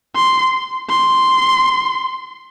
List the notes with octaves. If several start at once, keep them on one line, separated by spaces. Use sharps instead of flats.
C6
C6